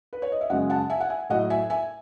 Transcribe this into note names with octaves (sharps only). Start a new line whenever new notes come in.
B4
C#5
D#5
E5
F#2 C#3 G#3 D#5 F#5
F#5 A5
E5 G#5
F#5
E5 G#5
A2 F#3 D#5 F#5
E5 G#5
E5 G#5